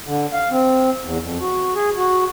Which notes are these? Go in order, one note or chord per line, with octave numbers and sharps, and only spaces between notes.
D3
F5
C4
E2
F2
F#4
G#4
F#4